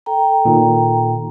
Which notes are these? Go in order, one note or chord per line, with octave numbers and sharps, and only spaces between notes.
A4 G5 A#5
A#2 D#3